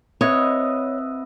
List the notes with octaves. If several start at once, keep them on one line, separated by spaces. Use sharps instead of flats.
C4 B4 C#5 D#5 E5